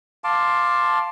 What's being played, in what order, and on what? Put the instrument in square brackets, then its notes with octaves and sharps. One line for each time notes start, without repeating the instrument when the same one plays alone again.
[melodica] F5 A5 C6 D6